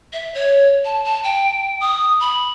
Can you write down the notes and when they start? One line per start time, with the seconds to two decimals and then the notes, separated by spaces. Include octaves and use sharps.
0.13 E5
0.34 C#5
0.85 A5
1.05 A5
1.24 G5
1.81 D#6
2.20 B5